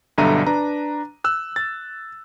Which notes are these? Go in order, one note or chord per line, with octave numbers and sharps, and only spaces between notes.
B1 G2 D3 E5 A#5 D#7
D4 B4 A#5
E6 F#6
A6